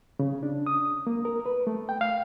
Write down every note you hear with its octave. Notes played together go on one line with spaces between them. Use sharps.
C#3
D4
D#6
A#3
A#4
B4
A3
G5
F5